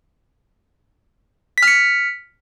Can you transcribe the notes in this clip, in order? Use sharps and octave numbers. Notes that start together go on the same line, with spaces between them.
F6 B6 C#7